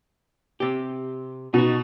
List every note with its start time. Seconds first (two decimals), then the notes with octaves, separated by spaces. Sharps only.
0.60 C3 G4
1.54 B2 D#4 F#4